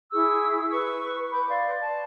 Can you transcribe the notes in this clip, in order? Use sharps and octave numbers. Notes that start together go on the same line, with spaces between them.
E4 G#4 C#6 E6
B4 C#6
B4 B5 D6 G6
D5 F5 C6
D5 A5